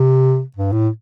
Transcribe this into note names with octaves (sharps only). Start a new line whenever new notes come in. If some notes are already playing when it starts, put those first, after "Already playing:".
Already playing: C3
G2
A2